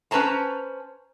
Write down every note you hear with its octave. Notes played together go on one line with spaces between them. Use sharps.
C#4 B4 C5 A5 A#5